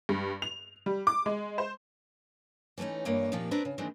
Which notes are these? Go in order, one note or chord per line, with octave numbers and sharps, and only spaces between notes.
G2
F7
G3
D6
G#3
C5
E3 A3 A#3 C#4 D#4
G2 E3 A#3 C#5 D#5
F2 A#2 D#3 F3 A#3 G4
C4 D4 A#4 B4
C#3
D#3 E3 G#3 A#3 C4 D4